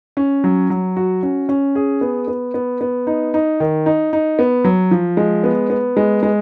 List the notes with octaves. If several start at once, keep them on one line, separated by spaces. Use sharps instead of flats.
C#4
F#3
F#3
F#4
C#4
C#4
G#4
B3
B3
B3
B3
D#4
D#4
D#3
D#4
D#4
B3
F#3
F3
G#3
B3
B3
G#3
G#3